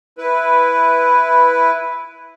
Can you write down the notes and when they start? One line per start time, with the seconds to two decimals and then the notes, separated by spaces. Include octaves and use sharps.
0.18 E4 B4